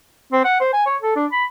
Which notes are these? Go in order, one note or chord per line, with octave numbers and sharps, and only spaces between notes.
C4
F#5
C5
G#5
C#5
A4
D4
B5